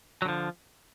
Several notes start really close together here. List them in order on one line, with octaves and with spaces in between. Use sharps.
F#3 D3 F3